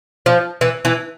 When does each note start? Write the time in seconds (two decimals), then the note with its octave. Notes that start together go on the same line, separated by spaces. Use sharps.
0.26 F3
0.61 E3
0.85 E3